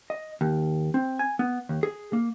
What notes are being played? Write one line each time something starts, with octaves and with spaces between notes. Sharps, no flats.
D#5
D#2
C4
G#5
B3
D#2
G#4
A#3